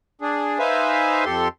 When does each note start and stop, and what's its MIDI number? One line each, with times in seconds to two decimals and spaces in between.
0.21 0.59 62
0.21 0.59 68
0.59 1.25 63
0.59 1.25 71
0.59 1.25 72
0.59 1.25 76
0.59 1.25 77
0.59 1.25 80
1.25 1.48 41
1.25 1.48 67
1.25 1.48 69
1.25 1.48 84